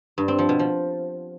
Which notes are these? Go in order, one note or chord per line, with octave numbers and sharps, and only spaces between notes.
G2
C4
F3
B2
F3